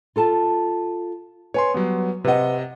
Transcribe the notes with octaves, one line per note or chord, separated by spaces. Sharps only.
F4 A4 A5
B4 C#5 G#5 C6
F#3 G3 B3
C3 B4 D#5 F#5